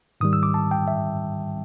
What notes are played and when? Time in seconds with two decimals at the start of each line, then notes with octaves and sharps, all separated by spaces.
0.21 G#2 D#3 G3 D#6
0.33 E6
0.43 D6
0.54 A5
0.71 G5
0.88 E5